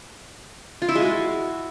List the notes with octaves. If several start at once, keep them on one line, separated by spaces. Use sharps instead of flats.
F4
E4
G#3
F#4